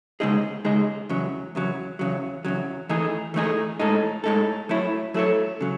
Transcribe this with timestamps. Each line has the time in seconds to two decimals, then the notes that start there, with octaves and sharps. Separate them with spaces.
0.20 C#3 G#3 D#4 G#4 D#5
0.65 C#3 G#3 D#4 G#4 D#5
1.09 E2 C#3 F#3
1.55 E2 C#3 F#3
1.99 E2 C#3 F#3
2.45 E2 C#3 F#3
2.89 E3 A3 D#4 G#4
3.34 E3 A3 D#4 G#4
3.79 A2 G#3 D#4 A4
4.24 A2 G#3 D#4 A4
4.69 F#3 A3 E4 A4 C#5
5.14 F#3 A3 E4 A4 C#5
5.61 C#3 F#3